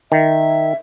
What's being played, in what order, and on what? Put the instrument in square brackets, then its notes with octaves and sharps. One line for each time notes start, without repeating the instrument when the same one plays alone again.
[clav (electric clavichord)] D#3 [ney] E5